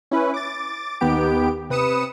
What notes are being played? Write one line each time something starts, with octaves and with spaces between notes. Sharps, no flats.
C#4 E4 B4
D6 A6
D#2 D#3 B3 G4 D7
C3 B4 D#6 C#7 E7